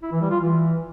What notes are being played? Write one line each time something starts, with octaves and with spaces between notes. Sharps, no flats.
E4
E3
G3
F4
E3